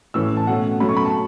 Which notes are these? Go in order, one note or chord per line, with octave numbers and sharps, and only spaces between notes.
A2 E3 C#4 E6
A5
B2 A3 C#4 F#5
B2 F#3 A3 C#4 B5
C#6
B5
A5